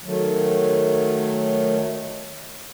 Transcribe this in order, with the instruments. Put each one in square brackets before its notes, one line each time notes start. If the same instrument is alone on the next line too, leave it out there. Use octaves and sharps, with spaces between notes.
[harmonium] D#3 F#3 A3